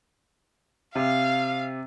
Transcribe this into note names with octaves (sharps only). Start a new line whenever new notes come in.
C3 F5